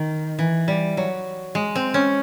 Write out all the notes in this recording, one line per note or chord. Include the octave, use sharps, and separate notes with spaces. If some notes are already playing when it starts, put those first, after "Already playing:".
Already playing: D#3
E3
G3
F#3
G#3
C4
C#4